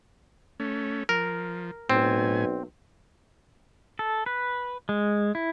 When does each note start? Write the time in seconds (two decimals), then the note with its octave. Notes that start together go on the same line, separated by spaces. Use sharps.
0.60 A3 C#4
1.09 F3 A#4
1.90 B1 A2 C4 G#5
3.99 A4
4.26 B4
4.89 G#3
5.35 E4